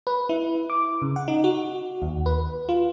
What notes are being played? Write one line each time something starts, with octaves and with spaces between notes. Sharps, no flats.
B4
E4
D6
C#3
F#5
D#4
F#4
D#2
B4
F4